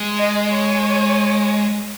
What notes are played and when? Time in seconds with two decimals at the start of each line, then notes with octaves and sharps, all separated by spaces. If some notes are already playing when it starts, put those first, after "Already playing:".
Already playing: G#3
0.18 D#5
0.52 C#5